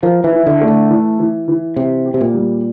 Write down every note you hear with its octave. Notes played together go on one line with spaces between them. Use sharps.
F3 A#4
E3
E4
D3
A3
D3
E3
E3
E3
C3 G4
G4
C3
A#2
G3